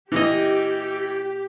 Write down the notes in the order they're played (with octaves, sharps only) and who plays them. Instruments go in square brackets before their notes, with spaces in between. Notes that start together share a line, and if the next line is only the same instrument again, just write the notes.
[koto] A#2 A#3 D#5 [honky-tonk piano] E3 [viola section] G4